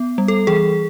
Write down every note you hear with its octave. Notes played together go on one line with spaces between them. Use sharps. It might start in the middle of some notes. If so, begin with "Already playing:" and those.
Already playing: B3
G3
A4
E3 G#4